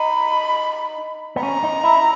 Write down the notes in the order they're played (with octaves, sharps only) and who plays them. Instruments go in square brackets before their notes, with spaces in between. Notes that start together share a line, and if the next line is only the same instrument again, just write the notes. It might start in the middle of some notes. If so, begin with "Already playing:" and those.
Already playing: [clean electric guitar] D#4 [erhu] B5
[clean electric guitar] B3
[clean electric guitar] C#4 [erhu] A#5
[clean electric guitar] D#4
E4